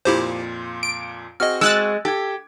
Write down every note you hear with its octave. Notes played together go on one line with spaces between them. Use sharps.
F2 A#2 E4 F4 G4 C5
D7
C4 F#4 G#4 D#5 F6
G#3 E6 F#6 A6
G4 A4 G#6